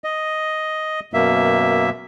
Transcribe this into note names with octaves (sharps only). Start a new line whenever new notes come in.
D#5
F#2 B2 A#3 E5